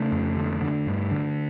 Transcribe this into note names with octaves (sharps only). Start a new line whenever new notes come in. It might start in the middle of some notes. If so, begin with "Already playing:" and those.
Already playing: C#3 A3
F2
D3
D3
G2
D3